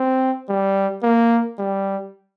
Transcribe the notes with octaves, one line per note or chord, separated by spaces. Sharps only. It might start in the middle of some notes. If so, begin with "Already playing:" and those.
Already playing: C4
G3
A#3
G3